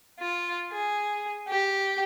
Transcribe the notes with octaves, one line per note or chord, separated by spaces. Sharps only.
F4
G#4
G4